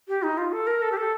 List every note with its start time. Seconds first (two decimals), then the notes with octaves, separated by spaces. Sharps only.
0.08 G4
0.23 D#4
0.38 F4
0.52 A4
0.67 A#4
0.82 A4
0.92 G4
0.97 A4